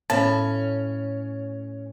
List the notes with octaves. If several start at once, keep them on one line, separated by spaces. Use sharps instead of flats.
A2 C#4 C#5 A5